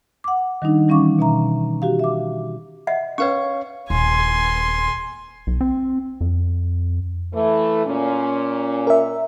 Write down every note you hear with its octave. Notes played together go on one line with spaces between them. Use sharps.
F#5 D6
D#3 G3 D4 D#4
E3 G3 C#4 F5 C#6 D6
B2 E5 A#5
F#4 G4 F5
E5 D6
D#5 E5 F#5
C#4 B4 C#5 F5 C#6
D#1 G#5 C6
B1
C4
F2
E3 A3
A#2 C#4
A#4 E5